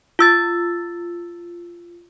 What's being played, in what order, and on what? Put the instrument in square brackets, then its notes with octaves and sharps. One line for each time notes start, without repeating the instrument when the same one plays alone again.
[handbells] F4 E6 A6